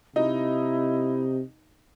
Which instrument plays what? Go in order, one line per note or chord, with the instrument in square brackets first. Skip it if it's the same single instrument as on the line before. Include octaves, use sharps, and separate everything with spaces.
[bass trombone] C3 [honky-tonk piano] D#4 [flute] E4